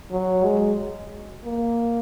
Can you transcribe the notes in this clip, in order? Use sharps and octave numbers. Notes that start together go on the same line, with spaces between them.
F#3
G#3
A#3